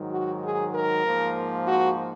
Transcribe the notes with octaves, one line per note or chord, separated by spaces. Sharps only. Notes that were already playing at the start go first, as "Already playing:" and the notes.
Already playing: G#2 D#3 F#3
F#4
G#4
A#4
G#2 F3 A#3
F#4